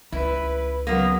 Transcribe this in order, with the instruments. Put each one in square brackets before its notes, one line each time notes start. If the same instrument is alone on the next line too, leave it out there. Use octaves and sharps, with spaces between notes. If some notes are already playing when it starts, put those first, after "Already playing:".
[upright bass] C#2 [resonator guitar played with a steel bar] E4 [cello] B4
[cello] C#3 F#3 [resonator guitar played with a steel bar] A#3 B3